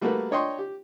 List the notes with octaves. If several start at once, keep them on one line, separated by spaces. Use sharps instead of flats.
G3 A3 A#3 F#4 A#4 B4
D4 C#5 D#5 G5 C6 C#6
G4